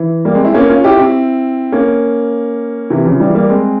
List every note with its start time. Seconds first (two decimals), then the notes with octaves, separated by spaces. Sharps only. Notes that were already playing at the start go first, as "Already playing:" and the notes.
Already playing: E3
0.25 G3 A#3
0.35 G#3 C4
0.45 C4 E4
0.54 A#3 C#4
0.69 C#4 F4
0.84 E4 G4
0.99 C4 E4
1.72 A#3 C#4
2.90 C3 E3
3.05 C#3 F3
3.20 E3 G3
3.35 G3 A#3
3.49 G#3 C4